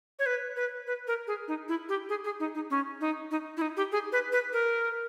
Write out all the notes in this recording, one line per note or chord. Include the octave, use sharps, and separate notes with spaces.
C#5
B4
B4
B4
A#4
G#4
D#4
E4
G4
G#4
G#4
D#4
D#4
C#4
D#4
D#4
E4
D#4
G4
G#4
B4
B4
A#4